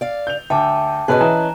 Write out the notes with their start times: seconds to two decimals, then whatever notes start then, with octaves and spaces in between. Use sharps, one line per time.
0.01 D5 F5
0.27 G6 F7
0.50 D2 E5 G5 A5 D6
1.08 B2 C#4 G#4 B4 D#5 A5 F#6
1.21 E3 A#5